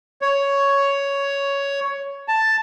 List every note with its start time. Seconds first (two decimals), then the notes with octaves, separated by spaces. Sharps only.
0.22 C#5
2.28 A5